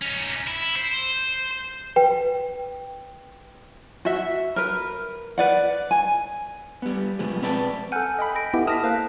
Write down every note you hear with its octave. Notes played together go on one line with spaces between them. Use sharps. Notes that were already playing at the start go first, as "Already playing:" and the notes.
C#4 D#4
E4
C5
B4 G5
F#4 E5
A#4 B4
B4 D5 F#5
G#5
G3 B3
B2 F3 G3 G#3 B3
C4 B4 D5 A5
A4 F#5 G#5 F6 G6
D#5 G5 B5
A4 A#6 D7
B3 E4 G4 D#5
A5 D#6 F6 A#6 B6
A#3 C5 F5 F#6